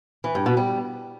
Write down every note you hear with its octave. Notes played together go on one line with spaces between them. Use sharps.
E3
G2
B2
G3